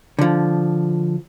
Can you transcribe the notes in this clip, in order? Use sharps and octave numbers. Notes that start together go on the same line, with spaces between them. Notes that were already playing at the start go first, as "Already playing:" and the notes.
D3 F3